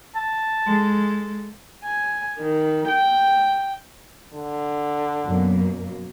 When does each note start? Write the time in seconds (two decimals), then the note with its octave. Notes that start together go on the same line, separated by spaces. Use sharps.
0.15 A5
0.64 G#3 A4
1.84 G#5
2.39 D#3
2.88 G5
4.33 D3
5.24 F#2 B2 A#3